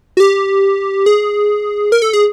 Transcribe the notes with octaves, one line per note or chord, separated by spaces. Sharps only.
F#4
G4
G#4
A#4
A4
G#4